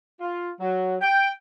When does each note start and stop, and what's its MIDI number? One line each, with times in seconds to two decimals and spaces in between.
0.20 0.50 65
0.60 0.95 54
1.01 1.28 79